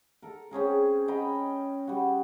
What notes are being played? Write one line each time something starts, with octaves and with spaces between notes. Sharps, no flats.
A4 A#4
C4 C#4 G#4 A#4
D#5 G5 A#5 B5
G3 F#4